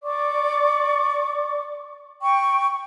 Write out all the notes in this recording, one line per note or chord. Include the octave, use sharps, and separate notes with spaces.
D5 C#6 D6
G5 C#6